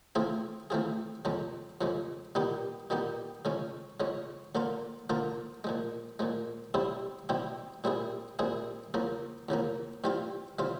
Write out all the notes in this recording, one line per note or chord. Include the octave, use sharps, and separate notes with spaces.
E3 A3 C4 F4 G#4
E3 A3 C4 F4 G#4
F2 C#3 F3 G#3
F2 C#3 F3 G#3
A#2 G3 B3 D#4 G4
A#2 G3 B3 D#4 G4
C#3 F3 G#3 C#4
C#3 F3 G#3 C#4
D3 F3 A#3 D4 F4
D3 F3 A#3 D4 F4
A#2 F3 G#3
A#2 F3 G#3
B2 G3 C4 E4 G4
B2 G3 C4 E4 G4
A#2 G3 C4 E4 G#4
A#2 G3 C4 E4 G#4
E2 C#3 F3 A#3
E2 C#3 F3 A#3
G2 E3 G3 C4 F4
E3 G3 C4 F4